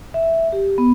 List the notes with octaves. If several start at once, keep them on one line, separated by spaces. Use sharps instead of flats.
E5
G4
B3